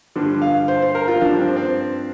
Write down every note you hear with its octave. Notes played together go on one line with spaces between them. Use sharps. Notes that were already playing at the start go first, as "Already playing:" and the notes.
G2 D3 F3
F5
C5
C5
A#4
F4
G2 F3 D4
C4
C4